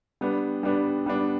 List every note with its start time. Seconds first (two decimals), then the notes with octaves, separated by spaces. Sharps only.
0.21 G3 B3 D4
0.63 G3 B3 D4
1.06 G3 B3 D4